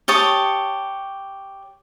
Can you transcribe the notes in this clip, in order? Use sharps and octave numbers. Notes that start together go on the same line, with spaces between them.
G4 C#5 A5 D#6